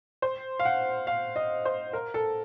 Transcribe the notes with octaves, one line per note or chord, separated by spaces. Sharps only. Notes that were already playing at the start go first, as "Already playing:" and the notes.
C5
F5
F#5
F5
D#5
C5
A#4
A4